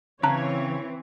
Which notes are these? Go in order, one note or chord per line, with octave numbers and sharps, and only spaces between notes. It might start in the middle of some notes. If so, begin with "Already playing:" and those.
C#3 E3 C4 C#5 A5 A#5 F#6